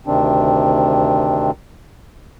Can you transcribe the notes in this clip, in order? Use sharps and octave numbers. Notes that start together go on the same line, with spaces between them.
D2 C3 D#3 C4 D4